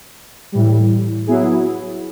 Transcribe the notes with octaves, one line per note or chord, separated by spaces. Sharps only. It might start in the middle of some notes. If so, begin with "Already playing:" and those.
A2 E3 G3
F#3 B3 E4 G#4